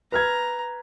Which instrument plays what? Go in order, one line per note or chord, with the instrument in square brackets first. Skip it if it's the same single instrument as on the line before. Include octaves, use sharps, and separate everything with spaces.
[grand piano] B4 F6 G#6 [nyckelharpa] A#5